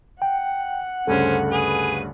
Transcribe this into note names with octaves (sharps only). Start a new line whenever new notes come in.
F#5 G5
D2 G2 C#3 C#4 A4 C5
G#4 B4